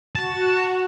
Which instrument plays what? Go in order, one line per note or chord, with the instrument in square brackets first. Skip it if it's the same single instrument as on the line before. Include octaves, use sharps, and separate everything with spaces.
[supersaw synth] F#4 [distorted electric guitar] A5